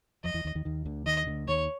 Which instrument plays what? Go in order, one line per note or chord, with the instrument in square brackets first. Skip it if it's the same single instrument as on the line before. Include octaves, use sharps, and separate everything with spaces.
[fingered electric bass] F2 F3 [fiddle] D#5
[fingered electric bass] E2 E3
D#2 D#3
D#2 D#3
D#2 D#3
D2 D3
[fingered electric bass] D#2 D#3 [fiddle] D#5
[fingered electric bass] D2 D3
[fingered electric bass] D#2 D#3 [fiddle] C#5